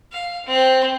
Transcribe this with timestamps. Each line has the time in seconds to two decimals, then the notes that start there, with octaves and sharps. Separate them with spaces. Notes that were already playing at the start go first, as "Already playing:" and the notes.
0.12 F5
0.45 C4